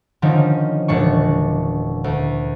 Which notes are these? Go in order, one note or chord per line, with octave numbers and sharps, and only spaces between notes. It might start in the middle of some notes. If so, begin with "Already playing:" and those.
D3 D#3 F3 C4 C#4 D#4
E1 A#2 D4 C#6
D2